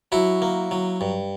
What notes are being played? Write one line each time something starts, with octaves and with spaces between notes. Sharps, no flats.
F#3 E4 F#4
A#3
F#3
G2